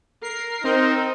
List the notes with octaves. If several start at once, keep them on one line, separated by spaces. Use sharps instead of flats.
A#4 C7
C4 D#4 C5